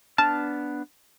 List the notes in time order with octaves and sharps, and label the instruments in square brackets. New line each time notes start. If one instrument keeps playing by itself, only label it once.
[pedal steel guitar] B3 D4 F6 [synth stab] A5